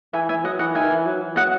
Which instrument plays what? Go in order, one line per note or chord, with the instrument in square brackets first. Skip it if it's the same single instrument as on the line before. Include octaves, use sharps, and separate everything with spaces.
[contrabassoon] E3 [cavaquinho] E5 G#5
[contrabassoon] E3 [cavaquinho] E5 G#5
[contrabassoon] F#3 [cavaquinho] D#5 F#5
[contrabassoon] E3 [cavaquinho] D#5 F#5
[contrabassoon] D#3 [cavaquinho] E5 G#5
[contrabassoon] E3
F#3
E3
[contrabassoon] F#3 [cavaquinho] D#5 F#5